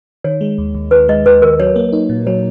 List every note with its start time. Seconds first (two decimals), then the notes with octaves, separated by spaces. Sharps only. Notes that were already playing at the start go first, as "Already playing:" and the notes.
0.24 D#3 C#5
0.41 G#3
0.58 D#2
0.75 D#2
0.91 D#3 B4
1.08 G#3 D#5
1.26 D#2 B4
1.42 D#2 A#4
1.60 F#3 C#5
1.76 A#3
1.92 D#4
2.09 A#2
2.27 F#3 C#5